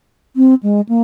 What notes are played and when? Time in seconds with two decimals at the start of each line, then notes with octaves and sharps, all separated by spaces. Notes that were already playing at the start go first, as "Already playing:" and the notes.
0.36 C4
0.63 G#3
0.89 A#3